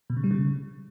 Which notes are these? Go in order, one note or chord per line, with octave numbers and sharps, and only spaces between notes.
B2
C#3
G3
C#3